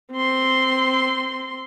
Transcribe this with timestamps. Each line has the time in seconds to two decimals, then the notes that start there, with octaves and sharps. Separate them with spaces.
0.13 C4 C6